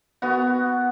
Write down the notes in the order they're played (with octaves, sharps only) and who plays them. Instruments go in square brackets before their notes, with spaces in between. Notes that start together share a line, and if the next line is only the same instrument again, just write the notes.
[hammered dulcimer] B3 F#4